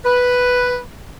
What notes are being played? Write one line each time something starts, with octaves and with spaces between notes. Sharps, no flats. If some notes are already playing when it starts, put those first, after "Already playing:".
B4